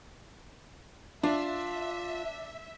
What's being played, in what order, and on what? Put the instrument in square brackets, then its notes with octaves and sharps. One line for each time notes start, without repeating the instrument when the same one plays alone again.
[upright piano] D4 [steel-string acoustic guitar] F4 [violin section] E5